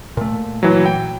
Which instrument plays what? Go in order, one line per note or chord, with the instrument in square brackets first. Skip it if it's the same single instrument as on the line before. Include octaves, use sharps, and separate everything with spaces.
[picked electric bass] A#2 A3
[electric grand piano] E3 F#3
G5